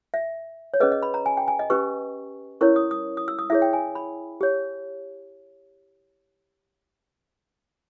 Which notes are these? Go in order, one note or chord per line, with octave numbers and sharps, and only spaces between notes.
E5
C#5
C#4 G#4 B4 D#5
D#5
B5
A#5
G#5
G5
G#5
D#5
C#4 G4 B4 C#6
C#4 E4 A#4 C#5 C#6
D#6
D#6
D#6
E6
D#6
E4 G#4 C#5 E5
G5
G#5
B5
G4 C#5